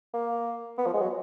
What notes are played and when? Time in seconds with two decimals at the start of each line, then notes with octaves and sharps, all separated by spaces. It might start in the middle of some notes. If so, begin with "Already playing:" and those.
0.14 A#3
0.78 B3
0.86 F3
0.94 G#3
1.02 F#3